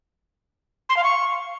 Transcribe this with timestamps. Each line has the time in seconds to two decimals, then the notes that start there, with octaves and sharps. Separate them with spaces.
0.89 C6
0.97 F5
1.04 C#6